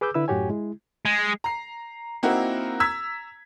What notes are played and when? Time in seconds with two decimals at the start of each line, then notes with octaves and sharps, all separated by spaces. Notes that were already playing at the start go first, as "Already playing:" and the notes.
0.01 G#4 B4 D6 E6 G6
0.14 D3 E4 B4 E6
0.28 F#2 A2 F#4 G4 C#5 G#5
0.50 G#3 E4
1.05 G#3
1.44 A#5 C7
2.23 A#3 C4 D#4 E4 F#4 A#4
2.80 A#5 E6 G#6 B6